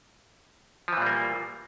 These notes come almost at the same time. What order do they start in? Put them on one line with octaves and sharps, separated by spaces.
F3 E3 A#2 G3 A#3